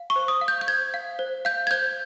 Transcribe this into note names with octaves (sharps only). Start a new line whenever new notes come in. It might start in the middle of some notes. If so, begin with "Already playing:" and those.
Already playing: F5
C#6
C5
D#6
F5
G6
G6
C5 G#6
F5
C5
F5 G6
G#6
C5 G6